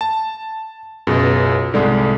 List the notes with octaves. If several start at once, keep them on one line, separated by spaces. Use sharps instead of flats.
A5
C#2 F#2 B2
C2 G#2 D3 G#3